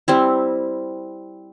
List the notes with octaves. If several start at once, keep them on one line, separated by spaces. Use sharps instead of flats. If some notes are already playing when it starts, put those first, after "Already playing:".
G3 C4 E4